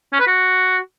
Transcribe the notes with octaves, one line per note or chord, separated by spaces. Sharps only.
C#4
B4
F#4